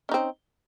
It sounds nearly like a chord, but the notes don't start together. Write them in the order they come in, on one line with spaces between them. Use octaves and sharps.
C#4 D#4 C4